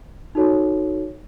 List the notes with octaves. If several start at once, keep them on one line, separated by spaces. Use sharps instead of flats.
D#4 F#4 A4 C#5